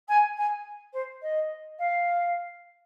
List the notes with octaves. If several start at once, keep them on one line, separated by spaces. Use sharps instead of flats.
G#5
G#5
C5
D#5
F5